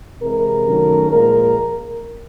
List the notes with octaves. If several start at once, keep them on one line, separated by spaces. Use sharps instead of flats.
C3 E3 G#3 A#4
F#2 D#3 F#3 A3
A#2 F3 G#3 A#4